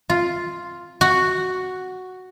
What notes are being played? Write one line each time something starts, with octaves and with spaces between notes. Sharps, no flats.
F4
F#4